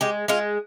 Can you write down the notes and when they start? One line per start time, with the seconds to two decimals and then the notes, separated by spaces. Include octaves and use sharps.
0.01 G#3 G4
0.28 G#3 F4